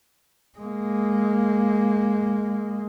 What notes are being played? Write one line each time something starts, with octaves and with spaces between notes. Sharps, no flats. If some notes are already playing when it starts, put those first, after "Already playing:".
G#3 A#3